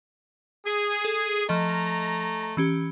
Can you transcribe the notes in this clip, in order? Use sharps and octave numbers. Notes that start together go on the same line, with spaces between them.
G#4
A4
F3 A3 D#5 A#5
E3 C#4 G4